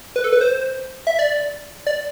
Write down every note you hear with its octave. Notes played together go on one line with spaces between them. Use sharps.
B4
A4
B4
C5
E5
D5
D5